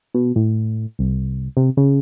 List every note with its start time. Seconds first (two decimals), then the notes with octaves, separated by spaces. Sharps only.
0.14 B2
0.36 A2
0.99 C2
1.57 C3
1.77 C#3